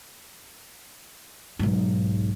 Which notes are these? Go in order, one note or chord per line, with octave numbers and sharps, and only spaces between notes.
B1 G#2